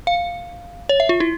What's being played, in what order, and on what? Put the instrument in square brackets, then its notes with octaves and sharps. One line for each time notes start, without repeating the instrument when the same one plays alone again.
[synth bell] F5
C#5
E5
F4
E4